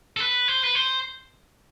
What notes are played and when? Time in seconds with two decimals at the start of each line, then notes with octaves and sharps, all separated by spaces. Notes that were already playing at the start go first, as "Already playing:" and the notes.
0.17 A4
0.20 B4
0.48 C5
0.64 B4
0.75 C5